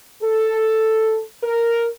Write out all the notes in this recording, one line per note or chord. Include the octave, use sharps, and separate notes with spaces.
A4
A#4